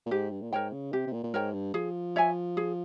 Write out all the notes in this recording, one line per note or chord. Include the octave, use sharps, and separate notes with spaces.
A#2
G#2 G4
G2
A#2
G#2 A#4 C#5 G5
C#3
C3 G4
C3
A#2
A#2
G#2 A#4 C#5 G5
G2
F3 G#4
C#5 E5 G#5
G#4